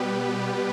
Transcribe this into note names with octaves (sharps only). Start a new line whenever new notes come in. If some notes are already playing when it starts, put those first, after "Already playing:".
Already playing: B2 G3 B3 G4 B4